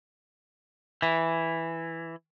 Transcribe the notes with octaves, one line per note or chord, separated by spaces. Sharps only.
E3